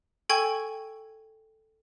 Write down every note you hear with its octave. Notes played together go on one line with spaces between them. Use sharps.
A4 G5 G#5 C#6 G#6